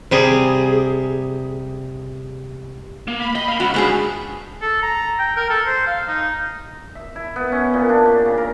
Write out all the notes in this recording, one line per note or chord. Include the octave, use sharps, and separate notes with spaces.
C3 G3 G#4
A#3
B5
D#5 G5
F5 A#5
C#2 F#4
C#2 G#2 D4 G#4 C5
A4
A#5
G5
A#4
A4
C5
F5
D#4
E5
E4
B3
C#4
A#2
D4
G4
C#3
A#4